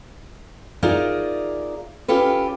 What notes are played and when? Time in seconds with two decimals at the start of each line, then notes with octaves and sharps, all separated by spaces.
0.82 D#4 F4 G#4 A#4 D5 E5
2.08 C#4 F4 G4 A4 B4